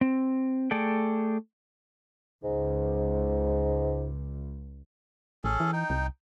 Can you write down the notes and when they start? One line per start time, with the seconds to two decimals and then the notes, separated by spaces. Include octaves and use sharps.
0.01 C4
0.71 A3 G#4 A4 D5 G5
2.43 C#2 G#2
5.44 A1 C#4 G#4 A4
5.60 E3
5.73 D#4 G5
5.90 C2